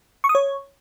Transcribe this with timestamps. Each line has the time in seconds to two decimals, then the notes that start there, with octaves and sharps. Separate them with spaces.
0.24 C#6
0.29 D#6
0.35 C#5